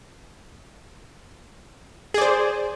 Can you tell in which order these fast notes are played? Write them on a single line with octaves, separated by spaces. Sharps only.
G#4 D5 C5